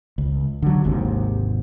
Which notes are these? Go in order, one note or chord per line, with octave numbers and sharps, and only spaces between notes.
C#2
D3 F#3
G#1 D#2 G#2 C3